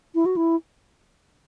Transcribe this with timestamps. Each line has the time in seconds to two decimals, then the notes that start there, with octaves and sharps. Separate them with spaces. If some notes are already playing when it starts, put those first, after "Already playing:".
0.15 E4
0.26 F#4
0.37 E4